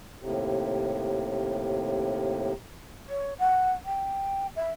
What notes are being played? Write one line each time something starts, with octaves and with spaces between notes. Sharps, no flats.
D#2 A2 C3
C#5
F#5
G5
E5